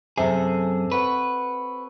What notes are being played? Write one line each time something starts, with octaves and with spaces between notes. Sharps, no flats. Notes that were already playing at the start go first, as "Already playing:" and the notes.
F#2 C3 G#4 A4
B4 C#5 F#5